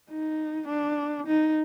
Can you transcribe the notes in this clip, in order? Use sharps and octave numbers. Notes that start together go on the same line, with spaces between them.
D#4
D4
D#4